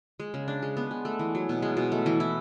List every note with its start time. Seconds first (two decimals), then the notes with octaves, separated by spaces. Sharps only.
0.20 G#3
0.34 C#3
0.48 D4
0.62 G#3
0.77 B3
0.91 G#3
1.05 A3
1.19 E3
1.35 F#3
1.49 B2
1.62 G#3
1.77 B2
1.92 A3
2.06 E3
2.20 E4